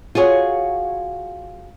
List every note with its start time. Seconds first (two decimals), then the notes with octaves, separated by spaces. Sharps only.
0.15 F4 F#4 G#4 C#5